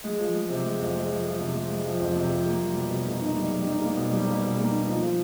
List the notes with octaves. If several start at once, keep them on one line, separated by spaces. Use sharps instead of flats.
G#3
F3
G#3
C3
G#3
F2
G#3
F3
F3
C3
G#3
G#3
F3
F2
C3
F3
A#3
G3
B2
B2
A#3
D#4
G3
G3
D#4
A#3
B2
G3
A#3
B2
A#3
D#4
F3
F3